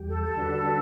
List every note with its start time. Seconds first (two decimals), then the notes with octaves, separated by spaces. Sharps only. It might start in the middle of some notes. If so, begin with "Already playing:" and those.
Already playing: E2 G3 G4
0.08 A4
0.23 A4
0.37 D3 G3 D4 F#4 B4